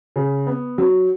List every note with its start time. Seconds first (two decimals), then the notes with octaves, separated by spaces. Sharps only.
0.16 C#3
0.47 B3
0.78 F#3